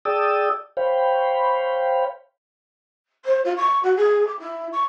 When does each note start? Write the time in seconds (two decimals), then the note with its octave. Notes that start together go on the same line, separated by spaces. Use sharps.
0.05 G#4 D5 G5 A5 D#6 E6
0.77 C5 C#5 F5 G5 B5
3.25 C5
3.44 F4
3.56 C#6
3.83 F#4
3.96 G#4
4.27 D6
4.39 E4
4.72 C#6